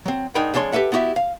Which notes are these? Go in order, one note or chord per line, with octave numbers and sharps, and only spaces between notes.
F#3 C4
G#2 D4 D#4 A#4 G5 B5
F2 G#3 D4 C#5 C6
G4 A4 B4 E5 F#5
B3 E4 F#4 G4 E5
F5